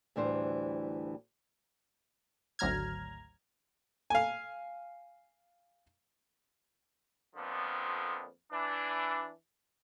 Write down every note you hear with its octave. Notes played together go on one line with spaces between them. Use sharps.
D2 A2 E3 G3 D4 C5
G#1 D2 F#3 A#5 F6 G#6
F5 G#5
F2 A#2 D3 F3 B3
E3 D4